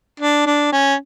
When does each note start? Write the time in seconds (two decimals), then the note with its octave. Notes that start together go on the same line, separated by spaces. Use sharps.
0.20 D4
0.46 D4
0.72 C#4